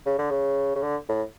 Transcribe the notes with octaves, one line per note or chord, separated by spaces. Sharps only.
C#3
D3
C#3
C#3
D3
A2